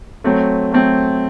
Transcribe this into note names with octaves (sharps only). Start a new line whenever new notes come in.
F#3 A3 C4
F#3 A3 C4